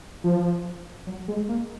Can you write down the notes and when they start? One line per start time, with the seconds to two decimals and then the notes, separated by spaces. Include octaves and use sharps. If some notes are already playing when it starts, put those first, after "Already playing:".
0.24 F3
1.07 F#3
1.28 G#3
1.48 A#3